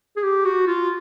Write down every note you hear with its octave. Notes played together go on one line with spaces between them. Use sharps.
G#4
G4
F#4
F4